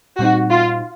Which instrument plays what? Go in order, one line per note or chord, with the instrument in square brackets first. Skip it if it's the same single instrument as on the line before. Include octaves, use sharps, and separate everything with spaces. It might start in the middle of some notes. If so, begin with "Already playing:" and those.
[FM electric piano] A#2 G3 C4 D#4 [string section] F#4
[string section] F4